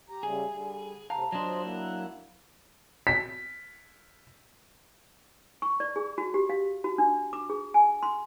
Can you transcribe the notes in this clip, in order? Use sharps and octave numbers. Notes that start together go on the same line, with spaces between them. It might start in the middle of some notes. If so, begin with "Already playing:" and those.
G4 A#5
C#3 G3 A3 G#4
D3 G3
A2 C3 F5 A5 A#5
F#3 D4 F4 C5 D#5
A#3 E4 F#5
B6
C#6
D5
G#4
F#4
G4
F5
F#4
D4
D6
G#4
G#5
C6